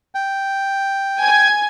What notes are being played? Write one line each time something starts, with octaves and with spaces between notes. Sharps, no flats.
G5
G#5 G#6